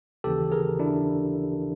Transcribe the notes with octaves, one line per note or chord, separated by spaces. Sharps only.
D#2 C#3 E3 G4 A4
G#4 A#4
D4 E4